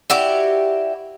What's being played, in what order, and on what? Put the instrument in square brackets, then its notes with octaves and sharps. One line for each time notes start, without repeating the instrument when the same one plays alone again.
[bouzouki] E4 F#4 G4 D5